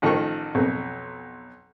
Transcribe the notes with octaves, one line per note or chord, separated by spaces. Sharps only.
A1 D#3 F3 A4 C#6
B1 F2